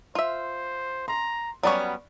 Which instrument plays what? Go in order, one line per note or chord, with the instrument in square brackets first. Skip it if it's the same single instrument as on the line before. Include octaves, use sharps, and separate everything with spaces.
[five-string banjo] F4 E5 [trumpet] C5
[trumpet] A#5 [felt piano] C6
[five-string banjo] F#3 G3 C#4 [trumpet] B3 [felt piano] D5 B5 C#6